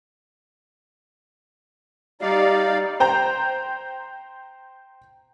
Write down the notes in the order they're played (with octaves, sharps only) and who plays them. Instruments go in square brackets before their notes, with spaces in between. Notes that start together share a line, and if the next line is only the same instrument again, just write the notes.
[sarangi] G3 [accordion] D#4 D5 F5
[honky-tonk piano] C5 G5 A#5 G6